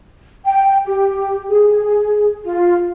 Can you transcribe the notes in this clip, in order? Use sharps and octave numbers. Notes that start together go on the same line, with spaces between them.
G5
G4
G#4
F4